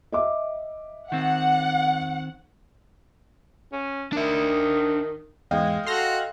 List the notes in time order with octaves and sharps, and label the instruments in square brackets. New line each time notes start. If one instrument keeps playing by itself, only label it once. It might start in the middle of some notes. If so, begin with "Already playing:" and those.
[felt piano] D#5 E5 D6
[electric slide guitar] D#3 C4 [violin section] F#5
[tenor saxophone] C#4
[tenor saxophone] D#3 [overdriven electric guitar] D4 E5
[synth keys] E2 G#2 [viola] G#3 [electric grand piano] D#5 F5 G5
[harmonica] F#4 [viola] A4 [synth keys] C6 F6 A#6